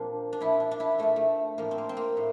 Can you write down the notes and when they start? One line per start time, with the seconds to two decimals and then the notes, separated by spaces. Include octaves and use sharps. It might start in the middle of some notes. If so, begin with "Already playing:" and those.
Already playing: A#2 F3 A#3 C4 D4
0.33 D4
0.40 A#2 F3 E4
0.60 D4
0.71 D4
0.80 E4
0.98 A#2 F3 A3
1.16 A3
1.58 A2 F3 A#3
1.71 C4
1.78 A#3
1.89 C4
1.97 A#3
2.17 A2